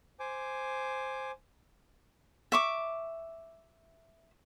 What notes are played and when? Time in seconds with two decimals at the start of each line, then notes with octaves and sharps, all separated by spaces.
0.20 C5 G#5 D6
2.52 E5 C#6 D6